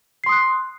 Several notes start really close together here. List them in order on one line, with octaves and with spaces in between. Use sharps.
C7 C6 D#6 F#6